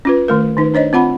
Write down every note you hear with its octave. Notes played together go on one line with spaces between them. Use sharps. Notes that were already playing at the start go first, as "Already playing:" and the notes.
C#4 F4 B4
D#3 A3 A#4
D#3 D#4 B4
D4 C5 C#5 D#5
C4 F4 F#5 B5